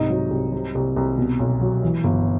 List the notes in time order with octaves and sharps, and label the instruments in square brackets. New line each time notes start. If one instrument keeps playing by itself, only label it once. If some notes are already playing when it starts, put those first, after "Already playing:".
Already playing: [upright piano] C2 G#2 D#4 D#5
F#3
C2
C3
C2
C2
B2
B1
F#3
E3
G1